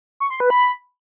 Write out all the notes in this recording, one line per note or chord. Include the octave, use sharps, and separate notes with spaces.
C#6
C6
B4
B5